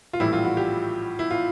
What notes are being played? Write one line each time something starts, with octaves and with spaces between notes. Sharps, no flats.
F4
A#1 A2 E3 G3 E4
F4
F#4
G4
E4
F4